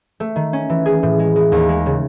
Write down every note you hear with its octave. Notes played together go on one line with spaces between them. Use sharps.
A3
D#3
C#4
E3
G#4
A2
G#3
G#3
D#2
G#3
C#3